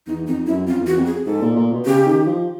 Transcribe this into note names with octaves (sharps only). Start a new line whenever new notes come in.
E2 D#4
F2 D#4
F#2 E4
F2 F4
E2
F#4
F2
G#4
G#2 A4
A#2
A#2
B2
C#3 G4
D#3
F3